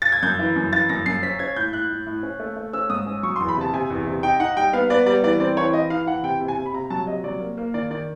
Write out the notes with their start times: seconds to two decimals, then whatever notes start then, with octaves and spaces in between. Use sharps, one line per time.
0.02 A6
0.12 G#6
0.23 F#2 G6
0.39 E3
0.56 F#2
0.72 E3 A6
0.89 F#2 A#6
1.06 F#2 C7
1.23 C#4 B6
1.39 C#4 G#6
1.56 A2 G6
1.73 A2 F#6
1.89 A2
2.06 A2
2.23 C#4
2.40 A3
2.56 A3
2.73 C#4 E6
2.90 G#2 D#6
3.06 C#4
3.23 F#3 C#6
3.36 C6
3.40 E2
3.48 B5
3.57 C3 A5
3.73 C3 G#5
3.90 E2
4.07 C3
4.23 D#4 G5
4.40 D#4 F#5
4.57 G3 G5
4.73 B3 F5
4.90 B3 D5
5.06 G3 D5
5.23 E3 D5
5.40 C4 D5
5.57 E3 C#5
5.73 E3 D#5
5.90 E3 F5
6.07 E3 F#5
6.23 C3 G5
6.41 C3
6.48 G#5
6.57 C3
6.66 B5
6.74 C3 A#5
6.90 F#3 A5
7.07 C3 D#5
7.24 F#3 D5
7.40 A#3
7.57 A#3
7.74 D#3 D5
7.90 D#3 D5